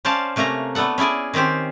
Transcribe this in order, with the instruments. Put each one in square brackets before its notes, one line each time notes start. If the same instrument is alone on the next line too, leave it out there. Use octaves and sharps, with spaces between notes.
[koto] C#4 C5 D5 F5 A5
C3 A3 A#3 C#4 A#5
A3 B3 D4 A4 F#5
C#4 E4 G#4 D5 G#5
D#3 C4 C#4 G4 C5